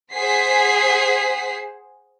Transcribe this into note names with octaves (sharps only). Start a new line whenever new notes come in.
G#4 C5 F#5 B6 C7